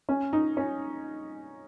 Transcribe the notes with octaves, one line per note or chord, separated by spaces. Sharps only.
C#4
D#4
C#4